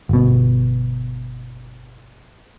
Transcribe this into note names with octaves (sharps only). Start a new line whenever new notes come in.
G1 B2